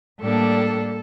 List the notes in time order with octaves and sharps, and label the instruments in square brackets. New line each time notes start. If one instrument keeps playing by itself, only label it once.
[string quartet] A2 G3 A#3 D4 A4